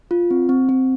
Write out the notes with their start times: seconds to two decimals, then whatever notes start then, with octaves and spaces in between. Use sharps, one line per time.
0.11 F4
0.31 C4
0.49 C4
0.69 C4